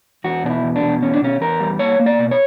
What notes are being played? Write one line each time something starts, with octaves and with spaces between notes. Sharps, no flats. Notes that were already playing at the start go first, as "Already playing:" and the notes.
E2 F#4
B2 D4
E4
E2
D4
B2
E2 C#4
D4
B2 C#4
E2 A#4
G3
A#3 C#5
A#3
D5
B2
C#5